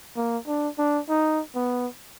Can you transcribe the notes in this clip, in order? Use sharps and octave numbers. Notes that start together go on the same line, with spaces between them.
A#3
D4
D4
D#4
B3